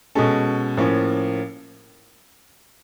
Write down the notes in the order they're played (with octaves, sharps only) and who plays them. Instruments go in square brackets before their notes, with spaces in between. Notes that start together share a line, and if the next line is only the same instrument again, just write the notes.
[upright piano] B2 G#3 C#4 A4
A2 F3 A#3 C#4